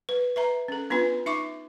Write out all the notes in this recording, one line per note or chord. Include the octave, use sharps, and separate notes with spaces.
B4
B4 E5 A#5
C#4 A4
B3 D4 F4 B4 G#5
D#4 E5 C#6 D6